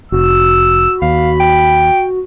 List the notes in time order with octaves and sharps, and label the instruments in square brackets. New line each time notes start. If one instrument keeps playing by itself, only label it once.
[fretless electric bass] F1 [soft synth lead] F#4 [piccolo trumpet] E6
[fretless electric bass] D#2 [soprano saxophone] F5 [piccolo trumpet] B5
[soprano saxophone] G5